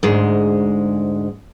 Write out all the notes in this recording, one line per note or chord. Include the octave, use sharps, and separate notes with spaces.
D2 G#2 G#3